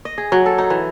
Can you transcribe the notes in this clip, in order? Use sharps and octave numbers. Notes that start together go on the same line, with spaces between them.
D#5
G#4
F#3
A4
D#4
E3